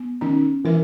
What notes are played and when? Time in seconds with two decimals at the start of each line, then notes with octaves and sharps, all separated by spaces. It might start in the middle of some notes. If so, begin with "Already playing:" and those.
Already playing: B3
0.21 D#3 C#4
0.64 E3 A#4